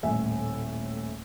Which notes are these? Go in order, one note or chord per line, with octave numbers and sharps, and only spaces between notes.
D#1 A2 E5 G#5